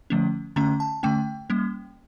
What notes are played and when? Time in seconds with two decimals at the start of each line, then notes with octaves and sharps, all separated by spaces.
0.10 D3 F3 A3 C#4
0.56 D3 A3 C#4 A#5
0.80 A5
1.03 D3 A3 C#4 G5
1.50 G3 A#3 C#4